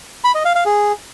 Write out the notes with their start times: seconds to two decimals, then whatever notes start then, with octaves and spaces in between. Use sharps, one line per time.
0.24 B5
0.35 D#5
0.45 F5
0.55 F5
0.66 G#4